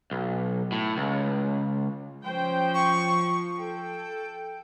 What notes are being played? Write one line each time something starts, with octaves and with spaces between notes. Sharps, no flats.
B1
A2
C#2
F3 C#4 C5 G5
C#6
A4 G5